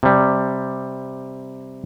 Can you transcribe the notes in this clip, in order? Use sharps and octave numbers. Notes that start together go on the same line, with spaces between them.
C3 G3